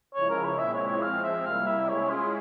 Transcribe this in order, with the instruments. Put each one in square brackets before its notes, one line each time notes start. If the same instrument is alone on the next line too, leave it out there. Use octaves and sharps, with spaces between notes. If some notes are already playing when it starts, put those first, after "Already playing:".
[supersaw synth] C#3 F3 G#3 E4 [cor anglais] C#5
[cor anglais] A#4
C#5
[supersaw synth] A#2 G#3 C4 E4 [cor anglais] E5
[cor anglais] C#5
C#5
[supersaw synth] F3 G#3 C4 [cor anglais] F5
[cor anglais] E5
[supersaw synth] C3 G3 A#3 E4 [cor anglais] F5
[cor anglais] E5
[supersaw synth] G#3 C#4 E4 G#4 [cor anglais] C#5
[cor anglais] F4